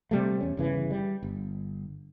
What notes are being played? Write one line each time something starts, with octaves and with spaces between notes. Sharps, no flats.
C3 G3 A3
E2 C#4
G1 C#3 E3
G3
G1